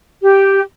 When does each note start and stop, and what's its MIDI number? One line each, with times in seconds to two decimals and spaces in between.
0.22 0.61 67